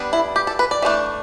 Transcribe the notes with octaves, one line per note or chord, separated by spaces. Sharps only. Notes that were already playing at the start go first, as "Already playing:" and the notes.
Already playing: G3 B3 D4
E4
G4
A4
B4
D5
E3 A3 D4